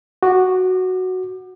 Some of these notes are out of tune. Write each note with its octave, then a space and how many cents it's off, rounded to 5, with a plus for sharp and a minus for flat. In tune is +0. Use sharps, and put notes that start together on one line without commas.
F#4 +0 D6 +30